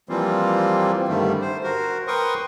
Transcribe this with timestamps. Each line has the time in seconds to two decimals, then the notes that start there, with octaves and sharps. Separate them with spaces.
0.09 E3 F3 G3 A#3 C4 F4
1.08 G2 D3 D#3 G3 A3
1.41 C5
1.63 F#4 A#4 C5
2.07 A#4 B4 G5 C6 C#6 D#6